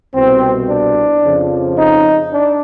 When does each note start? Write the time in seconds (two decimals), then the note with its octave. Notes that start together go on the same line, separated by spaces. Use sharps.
0.14 C2 B2 C4
0.69 D4
1.24 F2 C#3 F3
1.79 D#4
2.33 D4